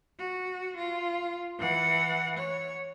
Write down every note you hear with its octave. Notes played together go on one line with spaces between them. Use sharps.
F#4
F4
E3 F#5
C#5